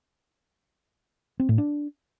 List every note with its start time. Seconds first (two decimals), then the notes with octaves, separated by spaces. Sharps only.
1.40 C4
1.49 A2
1.58 D4